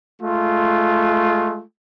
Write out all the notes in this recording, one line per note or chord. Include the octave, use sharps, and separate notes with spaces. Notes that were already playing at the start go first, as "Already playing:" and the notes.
G#3 A3 F4